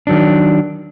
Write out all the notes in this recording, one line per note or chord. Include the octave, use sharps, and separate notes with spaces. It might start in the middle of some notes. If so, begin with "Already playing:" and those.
D#3 F#3 D4